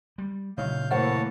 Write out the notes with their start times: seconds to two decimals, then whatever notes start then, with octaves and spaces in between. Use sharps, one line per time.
0.18 G3
0.58 A#2 C#3 F#3 D#4 E4 C#5 F5 G6
0.90 A2 E3 A#3 A#4 C5 C#5 F#5 A5